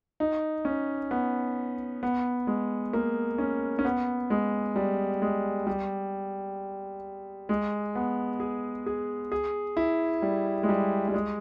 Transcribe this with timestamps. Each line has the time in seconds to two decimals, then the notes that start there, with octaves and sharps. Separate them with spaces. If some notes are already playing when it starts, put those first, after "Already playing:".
0.20 D#4
0.65 C#4
1.11 B3
2.03 B3
2.47 G#3
2.93 A#3
3.38 C#4
3.79 C#4
3.85 B3
4.30 G#3
4.76 G3
5.22 G#3
5.67 G3
7.49 G#3
7.95 B3
8.40 G#4
8.87 G#4
9.32 G#4
9.77 E4
10.22 G3
10.63 G#3
10.69 G3
11.08 G3
11.14 G#3